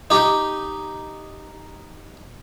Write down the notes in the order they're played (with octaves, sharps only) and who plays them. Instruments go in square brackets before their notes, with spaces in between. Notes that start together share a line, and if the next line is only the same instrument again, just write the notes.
[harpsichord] D#4 G4